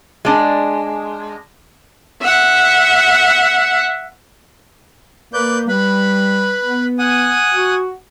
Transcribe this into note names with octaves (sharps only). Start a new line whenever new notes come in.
G#3 D4
E5 F#5
A#3 B4 D5 G6
G3 B4 B5
B3
F#5 G#5 D#6
F#4